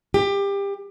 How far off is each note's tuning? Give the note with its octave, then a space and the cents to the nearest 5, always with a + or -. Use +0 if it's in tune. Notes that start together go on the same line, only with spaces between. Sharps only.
G4 +25